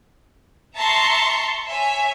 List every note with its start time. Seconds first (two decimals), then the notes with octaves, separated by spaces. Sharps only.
0.75 E5 A5 A#5 C6 C#6
1.66 C#5 E5 G#5